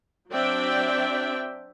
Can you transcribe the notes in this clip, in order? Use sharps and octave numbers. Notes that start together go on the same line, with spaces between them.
F#3 C4 D4 D5 E5 G5